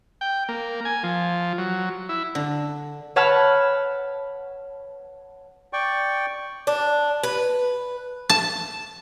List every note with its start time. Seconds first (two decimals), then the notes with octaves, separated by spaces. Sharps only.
0.21 G5
0.49 A#3
0.85 G#5
1.03 F3
1.58 F#3
2.09 E4
2.35 D3
3.16 B4 C#5 F#5 A5 B5 F6
5.73 D5 G5 C#6
6.67 D4
7.23 B4
8.30 A5